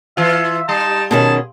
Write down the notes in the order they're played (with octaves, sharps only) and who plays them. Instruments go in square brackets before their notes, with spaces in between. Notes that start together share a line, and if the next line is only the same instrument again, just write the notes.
[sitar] E3 F4 [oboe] E5
[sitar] G3 [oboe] D#4 [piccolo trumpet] A5
[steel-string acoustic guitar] B2 D#3 C#4 [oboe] G#4 [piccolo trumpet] A5